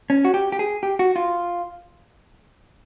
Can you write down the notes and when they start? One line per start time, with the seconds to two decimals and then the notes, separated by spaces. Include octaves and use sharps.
0.10 C#4
0.25 F#4
0.34 G4
0.52 G4
0.59 G#4
0.83 G4
0.99 F#4
1.16 F4